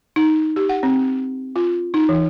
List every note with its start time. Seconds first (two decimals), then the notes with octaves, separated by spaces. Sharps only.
0.16 D#4
0.56 G4
0.69 F#5
0.83 C4
1.56 F4
1.94 D#4
2.09 E3